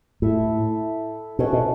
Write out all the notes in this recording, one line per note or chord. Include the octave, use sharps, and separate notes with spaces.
A2 E4 A4 E5
B2 A3 C#4 F#4
B2